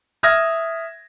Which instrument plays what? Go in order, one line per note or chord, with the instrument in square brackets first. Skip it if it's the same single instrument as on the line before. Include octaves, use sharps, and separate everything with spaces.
[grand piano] E5 D#6 F6 G#6 A#6